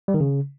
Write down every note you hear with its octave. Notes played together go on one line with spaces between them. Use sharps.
G3
D#3
C#3